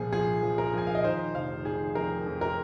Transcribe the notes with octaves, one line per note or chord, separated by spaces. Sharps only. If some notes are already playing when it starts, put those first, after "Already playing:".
Already playing: C2 A#2 F3 G#4
F3 G#4
F3
A#4
F3 G#5
F5
D#5
D#3 C5
F1 F5
D#3 G#4
F2 A#4
F2
A#4